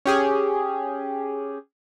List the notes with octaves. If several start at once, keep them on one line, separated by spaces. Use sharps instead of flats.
C#4 G4 G#4